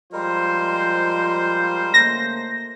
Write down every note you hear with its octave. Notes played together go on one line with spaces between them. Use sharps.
F3 G3 G#3 F4 A#4 C5
C#3 A3 A#3 A#6